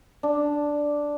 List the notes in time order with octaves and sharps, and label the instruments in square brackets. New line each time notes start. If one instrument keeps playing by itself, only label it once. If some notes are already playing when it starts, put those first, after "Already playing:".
[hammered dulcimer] D4